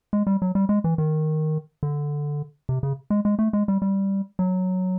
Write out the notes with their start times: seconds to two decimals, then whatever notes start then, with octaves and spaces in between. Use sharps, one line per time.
0.13 G#3
0.27 G3
0.42 F#3
0.55 G3
0.69 G#3
0.84 E3
0.98 D#3
1.83 D3
2.69 C3
2.83 C#3
3.10 G#3
3.25 G#3
3.39 A3
3.53 G#3
3.68 G3
3.82 G3
4.39 F#3